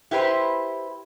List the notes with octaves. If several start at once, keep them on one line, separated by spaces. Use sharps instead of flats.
E4 G4 B4 C5